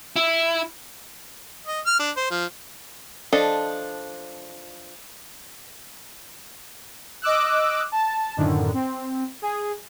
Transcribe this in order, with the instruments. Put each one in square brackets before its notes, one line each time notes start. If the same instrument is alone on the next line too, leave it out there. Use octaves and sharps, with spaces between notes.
[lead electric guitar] E4
[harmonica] D#5
F6
D4
C5
F3
[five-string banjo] F3 D4 A4 D#5
[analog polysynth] D#5 D6 E6 F#6
A5
F#2 A2 D3 D#3
C4
G#4